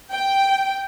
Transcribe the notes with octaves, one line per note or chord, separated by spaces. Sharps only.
G5